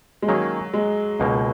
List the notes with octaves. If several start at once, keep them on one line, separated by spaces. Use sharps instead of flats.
G#3
D#3 F#3 A#3 C#4 G#4
G#3
C#2 B2 A#3